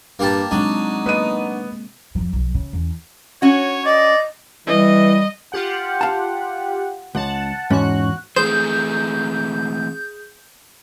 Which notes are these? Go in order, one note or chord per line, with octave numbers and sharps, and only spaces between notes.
G2 A#3 G4 A5
C3 F#3 G#3 C4 D4 D#4
A#3 B3 D#5 D#7
F2 F3
B1 F3
C#3
E2 C#4
C#4 F#4 C#5
D5 D#5
E3 G3 D#5
F4 G4 F#5
F5 A5
C#2 F#5 A5
E2 G#2 C#4 F#4 F#6
E3 A3 C4 G#4 C5 D#6 G6